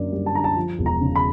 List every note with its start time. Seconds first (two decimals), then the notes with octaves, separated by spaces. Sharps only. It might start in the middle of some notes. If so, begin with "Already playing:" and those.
Already playing: F#2 D3 A#3 D5
0.12 G3
0.26 A5
0.34 D3 A#5
0.44 A5
0.56 F3
0.79 E1
0.86 A#5
1.01 C#3
1.15 B5